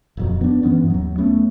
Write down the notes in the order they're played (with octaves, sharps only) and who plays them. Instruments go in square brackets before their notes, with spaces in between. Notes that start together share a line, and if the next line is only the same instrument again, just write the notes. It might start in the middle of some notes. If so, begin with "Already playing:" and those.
[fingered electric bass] D#1 F2 F#3
B3 D4
G2 E3 B3 C#4
D#2 F#3
A3 B3 C#4